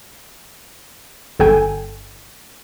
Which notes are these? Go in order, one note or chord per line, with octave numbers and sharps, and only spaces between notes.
G1 A4 G5 G#5